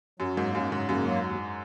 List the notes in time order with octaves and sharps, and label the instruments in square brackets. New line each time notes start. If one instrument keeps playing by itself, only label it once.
[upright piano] F#2 [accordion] F#3
[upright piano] G#2 [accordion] A#3
[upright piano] F#2 [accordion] F#3
[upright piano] G#2 [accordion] C#3
[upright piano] F#2 [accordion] A#3
[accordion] F#3
D#2